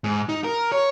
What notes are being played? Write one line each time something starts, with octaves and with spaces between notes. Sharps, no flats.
G#2
D#4
A#4
C#5